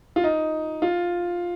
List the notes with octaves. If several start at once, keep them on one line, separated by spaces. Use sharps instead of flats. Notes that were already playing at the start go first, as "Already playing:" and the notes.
F4
D#4
F4